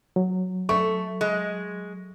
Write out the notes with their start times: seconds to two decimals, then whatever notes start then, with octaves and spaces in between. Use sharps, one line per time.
0.16 F#3
0.69 A3 C#6
1.21 G#3